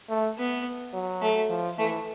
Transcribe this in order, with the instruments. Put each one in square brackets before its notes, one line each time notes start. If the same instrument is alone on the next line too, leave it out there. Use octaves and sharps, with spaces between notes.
[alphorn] A3
[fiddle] B3
[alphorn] F#3
[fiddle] A3
[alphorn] F3
[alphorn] E3 [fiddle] A3